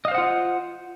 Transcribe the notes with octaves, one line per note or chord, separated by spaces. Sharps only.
F4 C5 D#5 F5 F#5